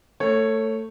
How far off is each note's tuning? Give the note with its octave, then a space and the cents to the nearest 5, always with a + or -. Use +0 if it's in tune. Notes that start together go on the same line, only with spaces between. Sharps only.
A3 +20 C#5 -10